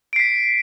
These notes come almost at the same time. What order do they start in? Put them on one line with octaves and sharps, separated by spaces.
D7 C7 B6